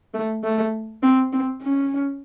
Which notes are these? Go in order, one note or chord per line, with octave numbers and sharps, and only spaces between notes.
A3
A3
C4
C4
C#4